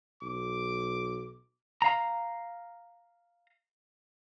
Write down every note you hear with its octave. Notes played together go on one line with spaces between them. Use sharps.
B1 D6
F5 A#5